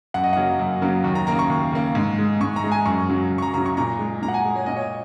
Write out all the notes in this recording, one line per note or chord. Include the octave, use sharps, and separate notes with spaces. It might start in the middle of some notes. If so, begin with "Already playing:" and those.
F#2 F#5
D#5
C#3 F#3 A#3 F#5
F#2
C#3 F#3 A#3
D#2
A#5
C#3 A#3 A#5
C#6
D#2
C#3 A#3
G#2
G#3
G#2 C#6
A#5
G#3
G#5
F#2 C#6
C#3 F#3
F#2
C#6
A#5
C#3 F#3 A#5
C#6
A#2 A#5
G#3
A#2 A#5
F#5
G#5
G#3
C#5
A#2 D#5
C#5